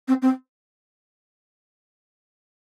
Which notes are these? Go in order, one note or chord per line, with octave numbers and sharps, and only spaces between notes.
C4
C4